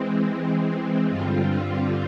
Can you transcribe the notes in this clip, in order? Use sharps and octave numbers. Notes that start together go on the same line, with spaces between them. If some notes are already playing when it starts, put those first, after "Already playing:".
Already playing: E3 G#3 C4
G2 D3 G3 C4 F4